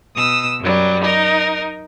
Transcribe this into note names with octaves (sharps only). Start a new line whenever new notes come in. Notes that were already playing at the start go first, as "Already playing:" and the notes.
B2 D#6 E6
F#2 F#3 G3
D#4 A#4